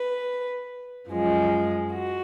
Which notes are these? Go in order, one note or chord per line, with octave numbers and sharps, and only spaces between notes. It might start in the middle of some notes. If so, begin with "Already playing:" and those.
Already playing: B4
F#2 F3 G#3
F#4